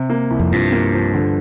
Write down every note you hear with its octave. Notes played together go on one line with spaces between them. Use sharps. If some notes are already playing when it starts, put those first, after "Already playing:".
Already playing: C3
A#3
C2
F2
G2 F3
A#3
F3
D3